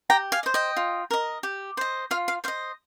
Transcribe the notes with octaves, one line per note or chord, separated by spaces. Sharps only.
G4 G5 A#5
F5 G#5
D#5
C5
D#5 G5
F4
A#4 D#5
G4
C5 D#5
F4 F5
F5
C5 D#5 F5